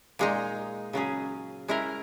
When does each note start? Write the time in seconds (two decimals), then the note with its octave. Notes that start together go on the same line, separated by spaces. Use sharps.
0.19 A#2 G#3 D#4
0.93 C#3 F#3 C#4 G#4
1.68 G#3 C#4 E4 A#4